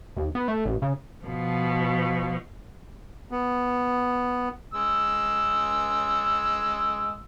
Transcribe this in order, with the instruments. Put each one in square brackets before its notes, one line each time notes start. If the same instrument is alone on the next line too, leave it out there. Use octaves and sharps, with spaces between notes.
[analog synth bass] D#2
B3
A3
A1
C#3
[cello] B2 F3
[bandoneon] B3
[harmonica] G#3 E6